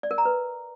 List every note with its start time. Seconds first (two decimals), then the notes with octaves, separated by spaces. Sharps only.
0.03 D5
0.11 A#4
0.18 A#5
0.25 B4